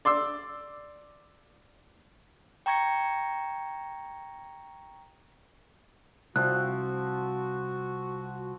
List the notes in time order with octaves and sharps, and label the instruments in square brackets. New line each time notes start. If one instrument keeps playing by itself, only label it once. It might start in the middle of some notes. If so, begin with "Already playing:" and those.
[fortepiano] D5 C6 D6 E6
[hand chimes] G5 A#5 C#6 G#6 A#6 C#7
[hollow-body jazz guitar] C2 [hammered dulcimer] F3 C4 [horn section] F#4 [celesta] F#6